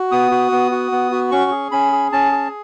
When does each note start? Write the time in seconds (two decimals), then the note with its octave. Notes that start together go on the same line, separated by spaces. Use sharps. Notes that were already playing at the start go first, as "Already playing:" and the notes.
Already playing: F#4
0.12 B3 D#6
0.31 F#4
0.52 B3
0.71 F#4
0.92 B3
1.12 F#4
1.31 C#4 C#6
1.51 G#4
1.71 C#4 B5
1.92 G#4
2.12 C#4 A5
2.32 G#4